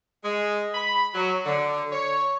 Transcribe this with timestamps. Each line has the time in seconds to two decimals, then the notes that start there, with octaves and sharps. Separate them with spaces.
0.25 G#3
0.74 B5
1.15 F#3
1.46 D3
1.93 C#5